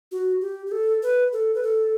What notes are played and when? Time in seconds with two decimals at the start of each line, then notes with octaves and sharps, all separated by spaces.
0.12 F#4
0.41 G4
0.66 G4
0.72 A4
1.03 B4
1.33 A4
1.55 B4
1.63 A4